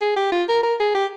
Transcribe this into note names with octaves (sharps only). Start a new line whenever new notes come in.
G#4
G4
F4
A#4
A#4
G#4
G4